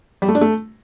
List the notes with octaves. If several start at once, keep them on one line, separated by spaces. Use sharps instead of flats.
G3
A3
D4
A3